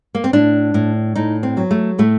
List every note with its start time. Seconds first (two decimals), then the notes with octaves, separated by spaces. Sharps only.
0.15 A#3
0.24 C4
0.33 A2 D4
0.74 A2
1.15 A2 D#4
1.43 C4
1.57 F#3
1.71 A3
1.99 A2 A3